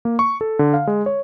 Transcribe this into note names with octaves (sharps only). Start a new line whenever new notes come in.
A#3
C#6
A4
D3
F5
G#3
C#5